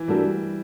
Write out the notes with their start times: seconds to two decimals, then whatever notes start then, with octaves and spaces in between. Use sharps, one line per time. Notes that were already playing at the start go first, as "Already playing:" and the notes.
Already playing: E3
0.08 G3 A3 D4 F#4 A#4